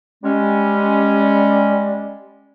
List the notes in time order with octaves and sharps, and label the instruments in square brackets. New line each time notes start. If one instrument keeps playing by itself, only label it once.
[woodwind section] G3 G#3 C#4